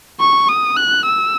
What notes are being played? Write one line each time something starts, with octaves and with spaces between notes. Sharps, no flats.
C#6
D#6
F#6
E6